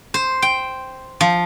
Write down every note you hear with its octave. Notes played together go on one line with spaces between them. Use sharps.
C5
G5
F3